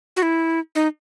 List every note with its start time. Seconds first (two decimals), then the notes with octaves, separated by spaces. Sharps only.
0.16 F#4
0.22 E4
0.75 D#4